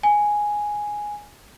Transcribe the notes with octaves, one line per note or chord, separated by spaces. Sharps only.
G#5